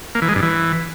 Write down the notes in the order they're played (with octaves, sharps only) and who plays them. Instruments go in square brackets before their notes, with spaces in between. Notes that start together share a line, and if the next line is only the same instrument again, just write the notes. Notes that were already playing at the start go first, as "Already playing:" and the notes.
[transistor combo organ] A#3
E3
G#3
G2
E3